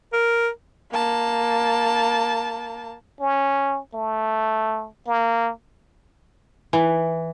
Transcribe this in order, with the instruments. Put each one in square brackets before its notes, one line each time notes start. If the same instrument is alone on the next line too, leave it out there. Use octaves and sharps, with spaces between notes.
[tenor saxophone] A#4
[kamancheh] A#3 A5
[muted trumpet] C#4
A3
A#3
[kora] E3